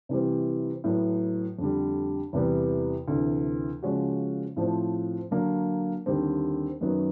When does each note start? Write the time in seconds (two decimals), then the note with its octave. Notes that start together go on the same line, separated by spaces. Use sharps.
0.09 C3 E3 G3 C4
0.84 A2 F#3 B3
1.58 F2 D3 G3
2.33 E2 C3 E3 G3 B3
3.08 D2 C3 E3
3.83 C#3 F3 G#3 C#4 F#4
4.56 A2 F3 A3 C4
5.31 D3 F#3 A#3
6.06 D#2 D3 G3 C4
6.81 F#2 D#3 F#3 B3